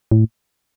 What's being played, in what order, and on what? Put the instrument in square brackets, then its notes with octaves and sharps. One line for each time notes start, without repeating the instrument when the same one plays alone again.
[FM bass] A2